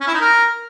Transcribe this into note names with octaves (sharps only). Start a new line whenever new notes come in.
C#4
E4
D#4
A#4